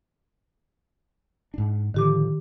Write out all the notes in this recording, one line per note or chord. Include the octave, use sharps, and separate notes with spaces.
G#2 D4
A2 D3 D#3 F3 G4 D6